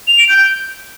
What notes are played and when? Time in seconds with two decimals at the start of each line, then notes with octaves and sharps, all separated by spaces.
0.08 F7
0.18 D7
0.29 G6